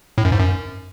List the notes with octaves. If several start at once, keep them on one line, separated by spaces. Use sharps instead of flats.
A2
F#2
G#2
F#2